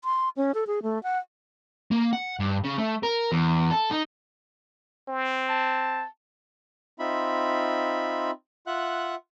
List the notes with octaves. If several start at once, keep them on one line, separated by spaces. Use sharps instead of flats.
C6
C#4
A4
G#4
A3
F#5
A#3
F#5
G2
C#3
A3
A#4
E2
A4
D#4
C4
A5
C4 D#4 F4 E5 B5
F4 E5 F#5 F#6